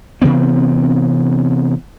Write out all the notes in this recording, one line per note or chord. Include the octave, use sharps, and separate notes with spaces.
C3 E3 B3 C4